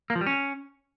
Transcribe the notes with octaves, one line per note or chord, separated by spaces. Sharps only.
A#3
F3
G3
C#4